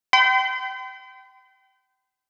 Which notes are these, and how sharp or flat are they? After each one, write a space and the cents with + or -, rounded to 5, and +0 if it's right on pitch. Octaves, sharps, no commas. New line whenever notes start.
G5 -25 C6 -45